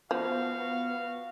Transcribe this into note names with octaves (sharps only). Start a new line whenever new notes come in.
F3 B3 F#4 F5